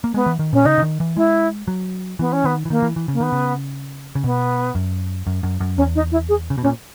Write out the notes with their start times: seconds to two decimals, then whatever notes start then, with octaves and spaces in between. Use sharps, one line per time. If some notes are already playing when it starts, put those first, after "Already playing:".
0.04 A#3
0.14 G#3 B3
0.26 E3
0.39 D#3
0.53 A#2 C#4
0.65 C#3 D#4
0.78 C#3
0.82 D#3
1.00 E3
1.16 G#3 E4
1.68 F#3
2.19 E3 B3
2.32 C#4
2.44 D#3 B3
2.65 E3
2.70 D#3 A#3
2.82 E3
2.96 E3
3.08 C#3 A#3
3.20 D#3 B3
3.32 C#3
4.16 C#3
4.24 B2 B3
4.75 F#2
5.27 F#2
5.43 F#2
5.60 F#2
5.77 E2 C#4
5.95 D#4
6.11 E4
6.28 G#4
6.50 C#3
6.58 B2
6.62 A#2 C#4